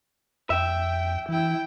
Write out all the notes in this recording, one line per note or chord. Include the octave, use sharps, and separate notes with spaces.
F2 E5 G5
E3 E4 G5